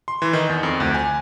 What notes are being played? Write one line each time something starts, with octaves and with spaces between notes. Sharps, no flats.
C6
E3
D#3
E2
F2
D2
G#5